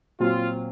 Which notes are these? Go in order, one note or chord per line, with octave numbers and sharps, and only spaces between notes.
A#2 F#3 C4 F4